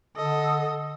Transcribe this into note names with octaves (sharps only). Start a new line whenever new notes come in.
D3 A4 D#5